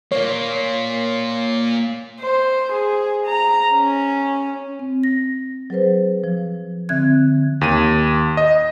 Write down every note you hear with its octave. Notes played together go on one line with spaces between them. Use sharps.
A#3 F4 C#5
C5
G#4
A#5
C#4
C4
A#6
F#3 G#4 B4 C5
F3
D3 C4 E5 F#6 G#6
D#2 D#7
D#5